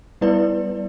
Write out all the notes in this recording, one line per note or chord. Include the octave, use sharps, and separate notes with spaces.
G3 B3 E4 B4 D5